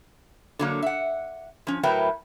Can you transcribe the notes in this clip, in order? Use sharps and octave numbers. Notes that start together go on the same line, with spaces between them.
D3 F#3 A#3
E5 F#5
F3 C#4
A2 F#3 A#4 B4 E5 G5